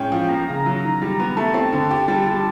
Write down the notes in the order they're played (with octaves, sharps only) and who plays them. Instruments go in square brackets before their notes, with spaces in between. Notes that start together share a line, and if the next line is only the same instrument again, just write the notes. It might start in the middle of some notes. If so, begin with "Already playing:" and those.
Already playing: [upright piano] A2 G#3 C#4 [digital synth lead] G5
[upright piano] F3
[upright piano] A#3 [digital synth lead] A#5
[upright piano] C#3
F#3
D#3
G3
B3
[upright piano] A3 [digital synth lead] A5
[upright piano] C4
D3
G4
G3
G3